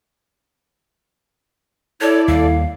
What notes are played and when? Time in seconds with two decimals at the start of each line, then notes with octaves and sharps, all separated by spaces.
2.01 E4 A4 C#5 D5
2.28 D#2 G3 A#3 F5